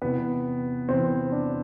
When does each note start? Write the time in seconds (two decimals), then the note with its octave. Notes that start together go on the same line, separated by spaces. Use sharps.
0.02 E2 C3 E3 B3
0.89 E2 C3 E3 C4
1.32 D4